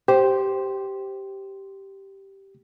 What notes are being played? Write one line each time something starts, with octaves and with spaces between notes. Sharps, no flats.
G4 C5